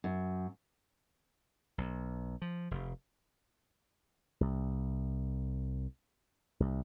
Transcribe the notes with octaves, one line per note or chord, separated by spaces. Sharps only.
F#2
B1
F3
F1
C2
C2